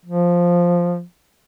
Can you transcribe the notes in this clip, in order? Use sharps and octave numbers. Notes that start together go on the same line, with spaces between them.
F3